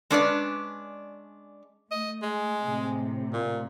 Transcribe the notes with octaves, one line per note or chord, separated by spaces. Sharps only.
G#3 C#4 D4 B4 C#5 D5
A3 D#5
G#3
A2 C3
A#2